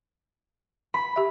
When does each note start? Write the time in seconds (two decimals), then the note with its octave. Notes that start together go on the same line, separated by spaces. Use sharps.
0.94 B5
1.16 G4 E5